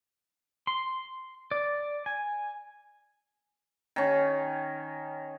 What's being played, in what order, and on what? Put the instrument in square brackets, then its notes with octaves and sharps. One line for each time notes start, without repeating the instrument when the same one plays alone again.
[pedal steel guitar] C6
D5
G#5
[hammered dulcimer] D#3 C#4